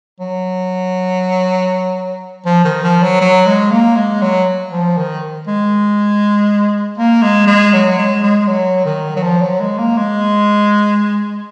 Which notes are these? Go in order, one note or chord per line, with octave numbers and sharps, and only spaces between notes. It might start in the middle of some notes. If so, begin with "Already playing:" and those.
F#3
F3
D#3
F3
F#3
F#3
G#3
A#3
G#3
F#3
F3
D#3
G#3
A#3
G#3
G#3
F#3
G#3
G#3
F#3
D#3
F#3
F3
F#3
G#3
A#3
G#3